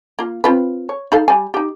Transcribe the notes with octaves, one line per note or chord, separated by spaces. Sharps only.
A#3 F4
C4 F4 B4
C#5
D#4 A4 F5
G3 G#5
D#4 G4